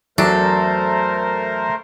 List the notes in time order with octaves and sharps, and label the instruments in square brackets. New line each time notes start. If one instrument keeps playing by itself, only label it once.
[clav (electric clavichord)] E2 F#3 D4 [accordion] A3 A#4 C5 [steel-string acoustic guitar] A4